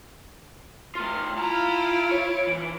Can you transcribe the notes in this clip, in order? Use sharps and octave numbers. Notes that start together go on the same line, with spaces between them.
A3 F4 F6
E4 F4 A5 A#5 F6
D7
C#5
E3 F3